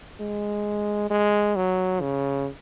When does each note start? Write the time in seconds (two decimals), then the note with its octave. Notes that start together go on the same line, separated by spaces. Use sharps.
0.20 G#3
1.10 G#3
1.56 F#3
2.01 C#3